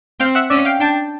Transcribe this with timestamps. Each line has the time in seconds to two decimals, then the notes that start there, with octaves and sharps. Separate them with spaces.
0.20 C4 F5 G5
0.35 E5 F#5
0.50 C#4 D5 E5
0.65 F5 G5
0.80 D4 G5 A5